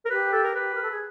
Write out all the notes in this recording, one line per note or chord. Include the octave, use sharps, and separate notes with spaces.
A#4
G4 B4
A4
A#4
B4
A#4
A4
G#4